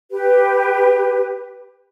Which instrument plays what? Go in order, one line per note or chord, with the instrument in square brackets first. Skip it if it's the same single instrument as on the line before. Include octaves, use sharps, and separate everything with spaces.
[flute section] G4 B4